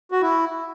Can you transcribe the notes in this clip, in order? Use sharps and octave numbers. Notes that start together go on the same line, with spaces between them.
F#4
E4